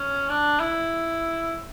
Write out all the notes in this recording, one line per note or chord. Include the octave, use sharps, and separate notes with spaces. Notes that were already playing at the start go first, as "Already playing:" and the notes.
Already playing: C#4
D4
E4